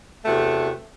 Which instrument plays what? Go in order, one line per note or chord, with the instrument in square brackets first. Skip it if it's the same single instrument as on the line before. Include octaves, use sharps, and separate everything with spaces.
[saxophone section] E2 C3 A3 F#4